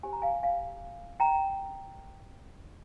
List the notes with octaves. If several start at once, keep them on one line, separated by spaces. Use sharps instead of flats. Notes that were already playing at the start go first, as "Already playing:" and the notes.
G4 C5 G#5
A#5
F5 G#5
F5 G#5
G5 A#5